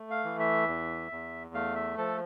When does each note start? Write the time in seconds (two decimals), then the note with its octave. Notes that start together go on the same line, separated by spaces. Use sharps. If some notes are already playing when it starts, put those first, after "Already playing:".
Already playing: A3
0.11 F5
0.24 E3
0.39 E5
0.68 E2
1.12 E2
1.54 A3 F5
1.75 E5
1.98 F3 A4